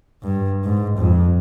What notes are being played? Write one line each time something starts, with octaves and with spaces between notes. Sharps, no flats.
G2
G#2
F2